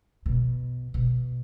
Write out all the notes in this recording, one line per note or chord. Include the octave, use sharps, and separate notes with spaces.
B2
B2